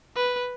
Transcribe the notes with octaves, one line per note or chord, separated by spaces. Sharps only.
B4